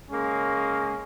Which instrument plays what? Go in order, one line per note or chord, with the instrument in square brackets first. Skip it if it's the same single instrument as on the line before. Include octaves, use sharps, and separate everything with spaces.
[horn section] C#3 G#3 A#3 C#4